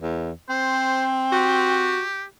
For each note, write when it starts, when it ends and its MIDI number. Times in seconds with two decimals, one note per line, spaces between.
0.01 0.31 40
0.49 1.98 60
0.49 1.07 72
1.32 2.03 66
1.32 2.24 67